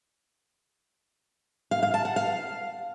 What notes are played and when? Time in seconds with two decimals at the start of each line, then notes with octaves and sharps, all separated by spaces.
1.71 F5
1.83 F5
1.94 A5
2.05 F#5
2.16 F5